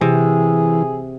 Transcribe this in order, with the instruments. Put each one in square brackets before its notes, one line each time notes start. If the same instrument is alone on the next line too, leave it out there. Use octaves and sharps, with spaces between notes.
[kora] C3 [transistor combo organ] E3 [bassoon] G#4